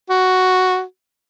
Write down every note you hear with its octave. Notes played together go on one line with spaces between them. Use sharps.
F#4